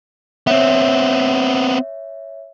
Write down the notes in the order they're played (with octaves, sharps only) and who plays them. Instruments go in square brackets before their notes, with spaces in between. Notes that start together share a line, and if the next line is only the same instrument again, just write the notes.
[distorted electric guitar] B3 C4 [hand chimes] C#5 E5